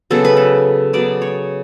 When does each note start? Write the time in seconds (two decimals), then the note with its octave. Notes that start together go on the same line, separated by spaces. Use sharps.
0.11 C#3 F#3 B3 A4
0.25 B4
0.37 A4
0.93 C#3 F#3 B3 D5
1.22 C#5